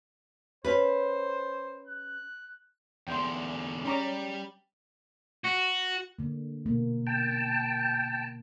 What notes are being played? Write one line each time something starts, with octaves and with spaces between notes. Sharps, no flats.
C#4 B4 C5
F#6
E2 D3 G5 C6
G3 C#4 A#5 D6
F#4
D3 A#3
B2 A#3
G5 A5